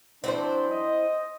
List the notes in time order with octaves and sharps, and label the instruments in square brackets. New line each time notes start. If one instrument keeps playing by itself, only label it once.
[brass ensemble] E3 F#3 D4 [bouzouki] C4 E4 C5
[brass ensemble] D#5